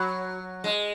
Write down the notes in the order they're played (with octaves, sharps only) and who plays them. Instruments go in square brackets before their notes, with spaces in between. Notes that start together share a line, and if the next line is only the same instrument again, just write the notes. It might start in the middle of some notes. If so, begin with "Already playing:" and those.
Already playing: [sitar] F#3 [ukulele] F#4 C#5 B5
[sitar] G#3